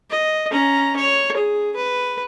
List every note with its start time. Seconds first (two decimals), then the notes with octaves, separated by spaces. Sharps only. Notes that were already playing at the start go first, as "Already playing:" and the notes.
0.10 D#5
0.51 C#4 A#5
0.97 C#5
1.37 G#4
1.76 B4